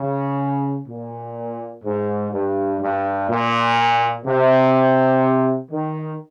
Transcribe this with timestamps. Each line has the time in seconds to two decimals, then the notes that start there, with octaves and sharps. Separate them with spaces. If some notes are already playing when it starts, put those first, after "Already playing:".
Already playing: C#3
0.88 A#2
1.84 G#2
2.32 G2
2.80 G2
3.29 A#2
4.25 C3
5.70 D#3